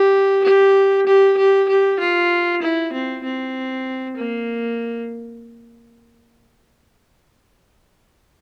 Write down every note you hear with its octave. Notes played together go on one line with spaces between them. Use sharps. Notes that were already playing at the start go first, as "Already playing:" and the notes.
Already playing: G4
G4
G4
G4
G4
F4
E4
C4
C4
A#3